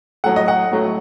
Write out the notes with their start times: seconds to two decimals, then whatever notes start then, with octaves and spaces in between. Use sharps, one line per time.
0.24 A2 F#3 A3 F#5
0.36 D#5
0.48 F#5
0.72 A2 F#3 A3